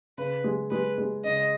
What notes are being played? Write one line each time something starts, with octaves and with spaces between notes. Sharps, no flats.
C#3 B4
G#3
G#3 B4
G#3
C#3 D#5